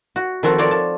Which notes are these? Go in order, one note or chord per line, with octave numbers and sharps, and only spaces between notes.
F#4
D#3 F3 C4 F#4 A4
C4 F4 A#4 C#5 D5
A5